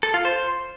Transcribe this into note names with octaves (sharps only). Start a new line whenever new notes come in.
A4
F4
C5